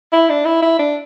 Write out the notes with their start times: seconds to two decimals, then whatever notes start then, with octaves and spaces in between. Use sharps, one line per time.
0.12 E4
0.30 D4
0.45 E4
0.62 E4
0.79 D4